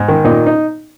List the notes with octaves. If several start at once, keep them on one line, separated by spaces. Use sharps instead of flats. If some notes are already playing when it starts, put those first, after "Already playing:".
Already playing: G#2
D#3
A#2 D#4
D#4